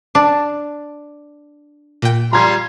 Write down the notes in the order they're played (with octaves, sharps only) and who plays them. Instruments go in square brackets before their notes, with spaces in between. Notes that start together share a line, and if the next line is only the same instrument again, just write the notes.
[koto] D4
[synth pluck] A#2 G5
[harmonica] G3 F4 C6 [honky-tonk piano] A#5 G#6